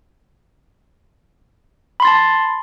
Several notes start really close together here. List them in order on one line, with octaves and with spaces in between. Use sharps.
B5 C6 A6 A5